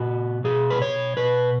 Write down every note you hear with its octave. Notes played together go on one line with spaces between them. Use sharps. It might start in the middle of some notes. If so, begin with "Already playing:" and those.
Already playing: A#2 F#4
B2 G#4
B4
C#5
B2 B4